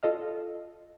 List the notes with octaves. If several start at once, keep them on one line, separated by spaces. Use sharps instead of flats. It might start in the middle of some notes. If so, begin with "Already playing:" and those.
F4 A4 D#5 F5